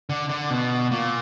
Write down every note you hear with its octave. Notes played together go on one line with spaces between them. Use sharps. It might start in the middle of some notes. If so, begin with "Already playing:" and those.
D3
D3
B2
A#2